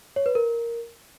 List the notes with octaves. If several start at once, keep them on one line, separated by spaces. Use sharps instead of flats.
C#5
B4
A#4